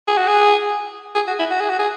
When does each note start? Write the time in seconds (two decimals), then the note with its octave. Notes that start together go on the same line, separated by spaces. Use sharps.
0.08 G#4
0.18 F#4
0.28 G#4
1.15 G#4
1.27 F#4
1.39 E4
1.51 F#4
1.60 G#4
1.70 F#4
1.79 G#4